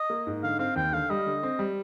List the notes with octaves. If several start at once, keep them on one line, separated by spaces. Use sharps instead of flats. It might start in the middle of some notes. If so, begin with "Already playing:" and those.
Already playing: D#5
A#3
G#2
D3 F5
C4 F5
D#2 G5
D3 F5
G3 D#5
D3
C4
G3